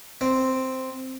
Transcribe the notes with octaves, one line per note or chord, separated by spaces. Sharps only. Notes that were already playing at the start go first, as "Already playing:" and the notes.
C4